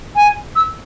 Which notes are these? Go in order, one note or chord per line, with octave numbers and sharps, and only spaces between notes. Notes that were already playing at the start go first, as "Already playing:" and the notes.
G#5
E6